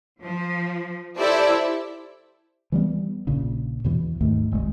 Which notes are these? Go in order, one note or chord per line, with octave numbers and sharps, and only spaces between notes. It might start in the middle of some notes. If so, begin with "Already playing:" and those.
F3
E4 G4 A4 C5 D5 E5
E3 G3 A#3 B3
A#1 A#2 C#3
E2 B2 E3
D#2 G#2 D#3 A3
E1 C2 G#3